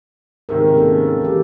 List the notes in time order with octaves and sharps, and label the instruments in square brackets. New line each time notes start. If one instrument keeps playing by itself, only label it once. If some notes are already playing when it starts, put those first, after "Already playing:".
[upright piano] G#2 C3 D#3 [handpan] G#3 A#4
[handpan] A#3 C#4 A4
E3 G4